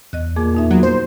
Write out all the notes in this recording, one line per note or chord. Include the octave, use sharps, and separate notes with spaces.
E2 D#5 F#6
F2 A#2 G#4 D6
F2 D#4 E5
F#3 B3 F#4
C5